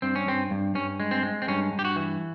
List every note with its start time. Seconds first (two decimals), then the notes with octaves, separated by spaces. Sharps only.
0.02 G2 C4
0.15 C#4
0.26 G2 C4
0.51 G2
0.75 G2 C#4
1.00 G#3
1.11 C4
1.23 G#3
1.42 C4
1.48 G2 C#4
1.72 G2
1.79 G4
1.85 F#4
1.96 E3